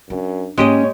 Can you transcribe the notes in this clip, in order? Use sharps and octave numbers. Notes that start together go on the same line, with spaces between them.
F#2 D4
G#2 G#3 A#3 C#4 G4 C#5 D#5